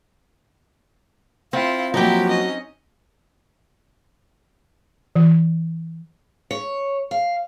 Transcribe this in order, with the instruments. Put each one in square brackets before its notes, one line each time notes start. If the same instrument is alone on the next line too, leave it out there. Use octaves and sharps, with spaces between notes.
[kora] C4 [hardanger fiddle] E4 F4 [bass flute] F5
[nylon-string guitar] F3 A#3 [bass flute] F#3 [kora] D#4 G5 [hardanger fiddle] E4 G4
[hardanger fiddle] C#4 D#5
[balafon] E3
[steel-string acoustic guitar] C#5
F5